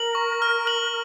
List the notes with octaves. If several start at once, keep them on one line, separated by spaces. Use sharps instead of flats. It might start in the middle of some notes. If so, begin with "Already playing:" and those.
Already playing: A#4 F#7
C#6
F6
F#7